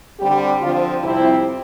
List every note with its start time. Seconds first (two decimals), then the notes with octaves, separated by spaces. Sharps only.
0.20 D3 G3 C4 G4
0.61 D3 F3 C4 F4
1.03 F2 C3 G3 C4 E4